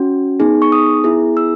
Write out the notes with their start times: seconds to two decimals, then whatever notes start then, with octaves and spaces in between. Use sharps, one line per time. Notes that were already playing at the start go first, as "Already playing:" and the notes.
Already playing: C#4 F#4
0.40 B3 D#4 G#4
0.62 C#6
0.72 D#6
1.04 B3 E4 G#4
1.37 E6